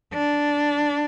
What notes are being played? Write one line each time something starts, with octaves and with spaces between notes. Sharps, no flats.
D4